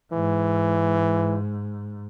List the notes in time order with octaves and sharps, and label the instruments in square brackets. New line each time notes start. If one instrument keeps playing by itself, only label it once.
[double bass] G#2 [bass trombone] E3